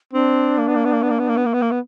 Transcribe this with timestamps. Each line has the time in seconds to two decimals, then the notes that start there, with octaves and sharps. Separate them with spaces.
0.13 C4 D4
0.58 A#3
0.68 B3
0.75 A#3
0.85 B3
0.93 A#3
1.02 B3
1.10 A#3
1.19 B3
1.28 A#3
1.37 B3
1.46 A#3
1.54 B3
1.62 A#3
1.71 B3